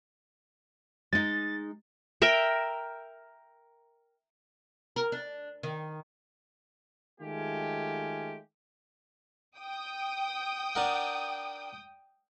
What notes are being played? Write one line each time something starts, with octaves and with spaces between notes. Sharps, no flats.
G#3 D#4 A6
A#4 E5 G5
A#4
D4
D#3
D#3 G#3 A3 F4 G4 G#5
G5 D#6
D4 A#4 F#5